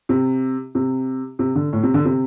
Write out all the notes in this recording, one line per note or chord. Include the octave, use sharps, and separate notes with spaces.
C3
C3
C3
D3
A2
C3
D3
C3